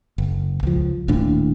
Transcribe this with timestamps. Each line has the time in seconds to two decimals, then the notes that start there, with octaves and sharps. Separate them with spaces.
0.18 F#1
0.63 C#2 F3
1.08 D#1 D#2 A2 D4